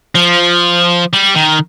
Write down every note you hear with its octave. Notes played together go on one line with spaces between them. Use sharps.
F3
G3
D#3